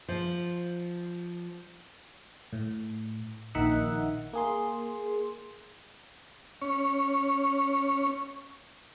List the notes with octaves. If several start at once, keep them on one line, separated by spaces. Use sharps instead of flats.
F3
A2
A#1 D#3 D#4 E5 F#5
A#3 G#4 C6
C#4 C#5